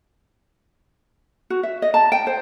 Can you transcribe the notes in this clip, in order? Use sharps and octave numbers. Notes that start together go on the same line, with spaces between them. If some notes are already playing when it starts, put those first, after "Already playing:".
F#4
E5
D#5
A5
G5
C5